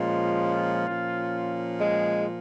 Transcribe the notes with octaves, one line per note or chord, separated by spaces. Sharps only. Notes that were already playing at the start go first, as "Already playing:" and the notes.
Already playing: A#2 F3 G#3 C#4 F4
A#2 F3 C#4
G#3 G#4